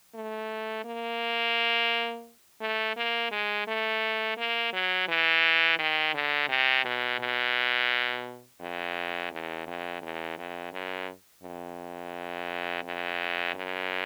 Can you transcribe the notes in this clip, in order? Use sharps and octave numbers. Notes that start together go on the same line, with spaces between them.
A3
A#3
A3
A#3
G#3
A3
A#3
F#3
E3
D#3
D3
C3
B2
B2
F2
E2
F2
E2
F2
F#2
F2
F2
F#2